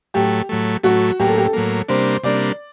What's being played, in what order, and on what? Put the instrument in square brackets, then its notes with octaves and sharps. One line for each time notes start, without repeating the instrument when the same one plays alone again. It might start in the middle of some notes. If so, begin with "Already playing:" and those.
[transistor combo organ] A2 F#3 A3 [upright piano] G4
[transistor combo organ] A2 F#3 A3
[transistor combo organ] A2 F#3 A3 [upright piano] F#4
[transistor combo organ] A2 F#3 A#3 [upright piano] G4
[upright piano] A4
G4
A4
[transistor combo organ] A2 F#3 A#3
[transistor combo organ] C3 G3 A#3 D4 [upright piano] C5
[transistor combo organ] C3 G3 A#3 D4 [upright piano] D5